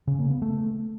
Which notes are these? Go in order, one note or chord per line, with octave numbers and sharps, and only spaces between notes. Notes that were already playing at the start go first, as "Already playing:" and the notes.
C#3
A#3
B3
A3